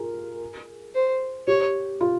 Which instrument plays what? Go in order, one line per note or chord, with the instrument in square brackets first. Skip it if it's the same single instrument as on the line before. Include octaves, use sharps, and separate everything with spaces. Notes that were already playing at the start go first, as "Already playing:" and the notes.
Already playing: [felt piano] F4 G#4 A#4
[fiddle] C5
[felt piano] G4 [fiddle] C#5
[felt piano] F4